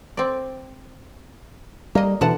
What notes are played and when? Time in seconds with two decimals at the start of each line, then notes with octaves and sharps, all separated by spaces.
0.17 C4 D5
1.95 G3 A#3 D#5
2.21 B2 D3 E3 F#5 A5